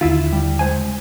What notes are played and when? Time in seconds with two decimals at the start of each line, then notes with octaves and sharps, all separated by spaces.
0.01 D#2 D3 E4 F4
0.32 G3
0.59 C#2 C5 G#5